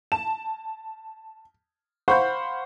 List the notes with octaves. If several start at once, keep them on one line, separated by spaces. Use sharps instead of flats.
A5 E7
C5 F5 F#5 B5 C#6 G6